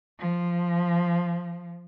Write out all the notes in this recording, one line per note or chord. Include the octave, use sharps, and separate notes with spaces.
F3